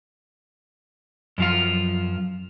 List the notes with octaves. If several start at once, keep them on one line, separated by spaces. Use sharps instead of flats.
F#2 F3 F4